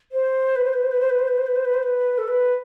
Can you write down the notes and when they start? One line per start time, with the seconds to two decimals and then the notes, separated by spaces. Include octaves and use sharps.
0.12 C5
0.56 B4
0.64 C5
0.73 B4
0.83 C5
0.91 B4
1.01 C5
1.10 B4
1.19 C5
1.28 B4
1.37 C5
1.47 B4
1.56 C5
1.65 B4
1.74 C5
1.83 B4
2.18 A4
2.28 B4